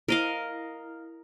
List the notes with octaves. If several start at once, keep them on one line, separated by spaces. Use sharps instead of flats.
E4 A#4 D#5 F5